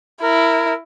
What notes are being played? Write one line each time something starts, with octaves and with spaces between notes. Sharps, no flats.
E4 A#4